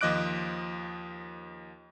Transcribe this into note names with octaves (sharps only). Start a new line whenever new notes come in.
D#2 F3 D#5 D6 F#6 D7